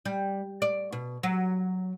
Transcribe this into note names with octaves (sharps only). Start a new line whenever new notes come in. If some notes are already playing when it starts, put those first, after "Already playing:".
G3
D5
B2
F#3